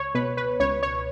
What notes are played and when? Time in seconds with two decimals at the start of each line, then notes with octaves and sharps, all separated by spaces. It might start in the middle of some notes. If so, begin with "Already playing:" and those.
Already playing: C#2 C#5
0.14 B2 B4
0.37 B4
0.60 C#2 C#5
0.83 C#5